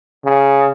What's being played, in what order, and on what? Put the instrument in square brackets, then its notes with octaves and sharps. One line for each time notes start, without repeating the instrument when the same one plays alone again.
[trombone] C#3